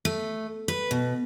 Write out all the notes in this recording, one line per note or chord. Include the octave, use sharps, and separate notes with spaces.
A3
B4
B2